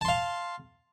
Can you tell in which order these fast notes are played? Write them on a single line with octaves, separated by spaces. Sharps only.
A5 C6 F5